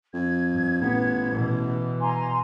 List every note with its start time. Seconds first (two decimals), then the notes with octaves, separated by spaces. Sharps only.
0.14 F2 G#6
0.53 G2
0.82 A1 A#2 B3
1.33 B2 E3
2.00 G#5 A#5 C6